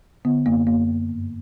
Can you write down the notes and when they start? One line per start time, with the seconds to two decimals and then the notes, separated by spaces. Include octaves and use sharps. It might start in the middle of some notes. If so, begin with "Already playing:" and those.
0.25 D3 B3
0.46 F#2 A#3
0.67 F#2 A#3
0.89 F#2
1.09 G2